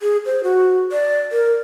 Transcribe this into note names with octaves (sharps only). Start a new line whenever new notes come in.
G#4
C5
F#4
D5
A#4